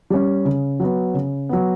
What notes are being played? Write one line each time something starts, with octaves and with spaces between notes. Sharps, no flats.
G3 C#4
C#3
F#3 B3
C#3
F#3 B3